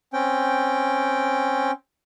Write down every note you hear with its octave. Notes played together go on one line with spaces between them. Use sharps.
C4 C#4 G5